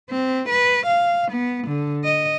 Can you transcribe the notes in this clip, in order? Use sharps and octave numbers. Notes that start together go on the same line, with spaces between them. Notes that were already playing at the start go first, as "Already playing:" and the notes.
C4
B4
F5
B3
D3
D#5